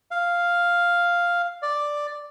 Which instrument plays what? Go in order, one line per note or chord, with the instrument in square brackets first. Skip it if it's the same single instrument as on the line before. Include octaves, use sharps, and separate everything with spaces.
[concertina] F5
D5